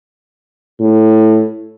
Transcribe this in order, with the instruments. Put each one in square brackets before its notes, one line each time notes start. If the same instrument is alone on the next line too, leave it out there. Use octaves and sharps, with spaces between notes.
[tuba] A2